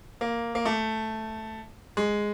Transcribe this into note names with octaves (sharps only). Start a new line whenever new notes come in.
A#3
A#3
A3
G#3